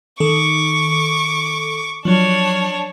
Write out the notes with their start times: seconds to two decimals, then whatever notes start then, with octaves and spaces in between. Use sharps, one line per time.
0.20 D#3 A4 C#6 D6
2.05 F3 F#3 D4 C#5